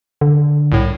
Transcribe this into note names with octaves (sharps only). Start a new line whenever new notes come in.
D3
C2 A2